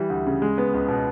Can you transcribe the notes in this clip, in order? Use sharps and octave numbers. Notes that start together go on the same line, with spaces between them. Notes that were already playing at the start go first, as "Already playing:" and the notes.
Already playing: E3 G3
D2
C#3
G#3
B3
C#2
B2